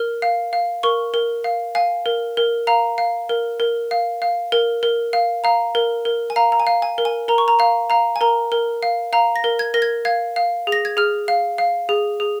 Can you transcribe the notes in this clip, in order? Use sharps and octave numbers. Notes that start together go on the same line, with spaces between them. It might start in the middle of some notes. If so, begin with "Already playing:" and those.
Already playing: A#4 F6
F5
F5
A#4 C#6
A#4
F5
F5 G#5
A#4
A#4
F5 A#5
F5
A#4
A#4
F5
F5
A#4
A#4
F5
F5 A#5
A#4
A#4
G#5
F5 A#5
A#5
G#5
F5
G#5
A#4
G#5
A#4 A#5
C#6
A#5
F5 A#5
F5 A#5
G#5
A#4 A#5
A#4
F5
F5 A#5
A#6
A#4
G#6
A#4 A#6
G#6
F5 G#6
F5
G#4
A#6
G#6
G#4 F6
F5
F5
G#4
G#4